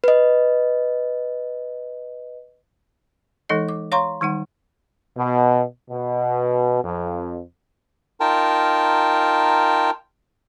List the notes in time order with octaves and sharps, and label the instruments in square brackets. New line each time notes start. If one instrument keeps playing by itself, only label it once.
[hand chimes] B4 D#5
[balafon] E3 G#3 D#4 A4 D#5
D6
C#5 F5 A#5 C6 C#6
D#3 G3 D#4 F#5
[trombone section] B2
B2
F2
[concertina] D#4 F4 A#4 G5 A5